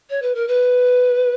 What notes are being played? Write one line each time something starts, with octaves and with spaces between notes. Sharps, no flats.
C#5
B4
A#4
B4